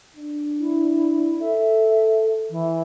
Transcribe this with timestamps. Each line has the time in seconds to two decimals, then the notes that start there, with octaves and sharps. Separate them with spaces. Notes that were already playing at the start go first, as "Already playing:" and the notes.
0.16 D4
0.60 E4
1.40 A4 E5
2.50 E3